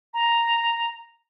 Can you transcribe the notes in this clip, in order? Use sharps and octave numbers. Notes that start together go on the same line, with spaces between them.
A#5